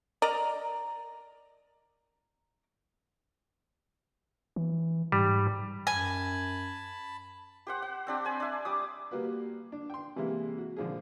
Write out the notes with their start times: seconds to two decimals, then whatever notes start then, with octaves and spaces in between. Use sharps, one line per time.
0.22 A#4 D5 D#5 A#5
4.56 E3
5.12 G#2 G3
5.87 F#2 G#5 A5 B5
7.67 G4 C5 F#5
7.82 F#5
8.07 C4 D4 G4
8.25 C5 G#5 B5
8.40 D4 E5
8.65 G3 D6 D#6
9.11 G3 A#3 F#4 B4
9.72 D4
9.90 G5 C6
10.16 C3 E3 G3 G#3 A#3 E4
10.58 F#4
10.77 A#1 D3 F3 G#3 G#4